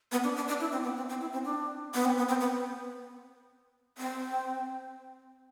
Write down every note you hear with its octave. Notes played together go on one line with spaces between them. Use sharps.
B3
D4
D4
D4
E4
C4
B3
C4
C4
E4
C4
D4
B3
C4
B3
C4
B3
C4